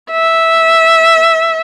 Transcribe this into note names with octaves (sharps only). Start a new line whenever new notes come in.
E5